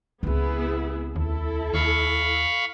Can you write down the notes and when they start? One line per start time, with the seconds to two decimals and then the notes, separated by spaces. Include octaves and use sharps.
0.23 C#2 B3 C4 E4 G#4
1.16 D#2 E4 A4
1.74 D#2 F5 B5 C#6